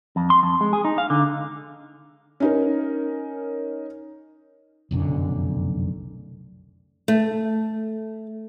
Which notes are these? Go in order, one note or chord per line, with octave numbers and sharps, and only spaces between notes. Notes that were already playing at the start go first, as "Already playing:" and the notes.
F2
C6
F2
G#3
G#4
D#4
F5
D3
C#4 D#4 A#4
F1 B1 F#2 D3
A3